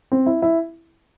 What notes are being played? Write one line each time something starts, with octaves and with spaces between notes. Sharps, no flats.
C4
E4
E4